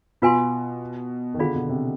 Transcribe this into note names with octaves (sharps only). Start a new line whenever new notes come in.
B2 F4 B4 F5 G#5 C6
D#3
D3 F4 G#4 D5 F5 B5
B2
C3